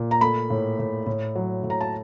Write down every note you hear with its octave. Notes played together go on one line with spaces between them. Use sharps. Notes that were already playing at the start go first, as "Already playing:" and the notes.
Already playing: A#2
A#5
A3 B5
A2
A2
A2
F#3
A2
A#5
A5